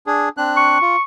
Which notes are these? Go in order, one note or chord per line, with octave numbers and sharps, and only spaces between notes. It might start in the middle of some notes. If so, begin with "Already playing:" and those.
D4 G#4
C4 D4 F#6
C#6
F4